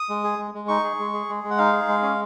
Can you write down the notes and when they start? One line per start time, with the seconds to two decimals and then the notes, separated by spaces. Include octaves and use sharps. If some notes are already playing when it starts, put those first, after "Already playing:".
Already playing: D#6
0.09 G#3
0.24 G#4
0.38 G#3
0.54 G#3
0.68 D#4 C#6
0.84 G#4
0.99 G#3
1.13 G#4
1.29 G#3
1.44 G#3
1.50 F#5
1.58 D#4 F5
1.73 G#4
1.88 G#3
2.03 C#4